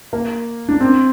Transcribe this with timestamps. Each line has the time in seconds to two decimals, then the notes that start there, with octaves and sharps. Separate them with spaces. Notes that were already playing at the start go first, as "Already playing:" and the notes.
0.13 A#3
0.69 D4
0.81 C4